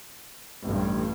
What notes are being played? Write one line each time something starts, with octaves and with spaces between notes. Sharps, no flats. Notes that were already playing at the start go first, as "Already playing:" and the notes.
A1 G2